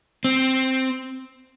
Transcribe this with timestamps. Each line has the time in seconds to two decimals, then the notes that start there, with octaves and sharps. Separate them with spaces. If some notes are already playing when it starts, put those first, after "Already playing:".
0.25 C4